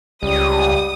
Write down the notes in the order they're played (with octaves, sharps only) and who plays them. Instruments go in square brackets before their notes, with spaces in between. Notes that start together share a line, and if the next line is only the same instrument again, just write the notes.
[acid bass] C#2 [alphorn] G3 [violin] D#6 D#7